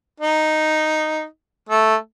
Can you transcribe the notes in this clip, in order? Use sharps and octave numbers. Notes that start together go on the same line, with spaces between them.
D#4
A3